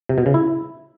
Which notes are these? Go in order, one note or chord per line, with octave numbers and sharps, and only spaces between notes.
C3
B2
C#3
E4